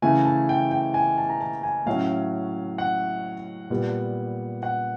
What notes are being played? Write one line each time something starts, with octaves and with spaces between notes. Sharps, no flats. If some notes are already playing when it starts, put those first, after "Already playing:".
C#3 E3 A3 G#5
A5
G5
G5
G#5
A5
A#5
A5
G#5
A2 F#3 A3 C#4 F5
F#5
A#2 G3 B3
F#5